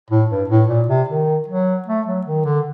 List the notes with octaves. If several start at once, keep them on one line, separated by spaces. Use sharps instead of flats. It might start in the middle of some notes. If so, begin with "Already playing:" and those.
A2
G2
A2
A#2
C3
D#3
F#3
A3
F#3
D#3
D3